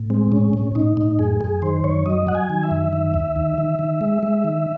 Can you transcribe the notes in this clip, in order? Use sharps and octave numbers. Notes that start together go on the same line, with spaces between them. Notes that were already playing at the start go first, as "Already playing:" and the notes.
Already playing: A2
G#3 C4
A2 C#4
A2
A2 D#4
A2
F#2 G#4
F#2 G#4
D#3 C5
F#2 C#5
F#3 D#5
F#3 F#5
G#5
D#3
E5
F#2
D#3
D#2
D#3
D#3
D#3
G#3
G#3
D#3